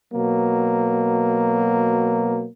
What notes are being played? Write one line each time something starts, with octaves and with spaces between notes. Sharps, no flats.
B2 F#3 A#3